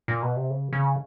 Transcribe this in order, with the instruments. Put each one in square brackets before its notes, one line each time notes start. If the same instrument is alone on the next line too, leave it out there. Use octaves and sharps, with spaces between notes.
[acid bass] A#2
B2
C3
C#3
C#3